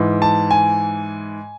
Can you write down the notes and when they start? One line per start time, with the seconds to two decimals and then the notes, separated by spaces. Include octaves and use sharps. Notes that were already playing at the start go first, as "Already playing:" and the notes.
Already playing: G#2 E3
0.22 A5
0.51 G#5